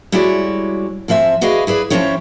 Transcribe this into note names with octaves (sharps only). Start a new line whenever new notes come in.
G3 G#3 E4 F#4 C#5 D5
F2 F3 C4 E5 G#5
F#4 G#4 B4 D5 D#5 F5
E4 G#4 B4 D5
F3 F#3 C4 C#4 E4 C#5